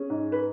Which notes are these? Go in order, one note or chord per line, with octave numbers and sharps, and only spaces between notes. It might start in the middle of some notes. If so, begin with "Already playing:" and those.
Already playing: C#4 G#4
G#2
B4